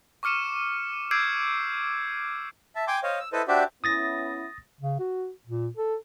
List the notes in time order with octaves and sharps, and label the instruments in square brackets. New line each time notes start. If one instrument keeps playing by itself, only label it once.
[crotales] C#6 D6 F6 C#7 D#7 E7
D6 E6 G6 G#6 C7 D7
[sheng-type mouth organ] E5 A5
G5 G#5 C6 D6
C5 C#5 D#5 F5
E6
E4 A4 B4 C5 D#5
D4 F#4 G4 C5 D5 E5
[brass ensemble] B3 C#4 E4 [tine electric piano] D#6 A6 A#6
[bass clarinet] C#3
F#4
A#2
A4